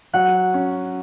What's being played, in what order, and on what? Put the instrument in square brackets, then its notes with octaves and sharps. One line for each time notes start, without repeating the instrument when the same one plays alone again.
[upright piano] F#3 [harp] F#5
[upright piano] C#4